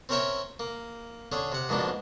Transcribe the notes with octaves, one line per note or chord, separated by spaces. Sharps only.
C4 C#4 A#4 C#5 E5 G5
A#3
D3 C#4 G#4
C3 F#5
F2 G#2 B2 A#3 D4